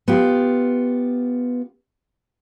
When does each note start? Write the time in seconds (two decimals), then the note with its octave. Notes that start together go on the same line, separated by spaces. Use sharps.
0.08 B3 F4 G4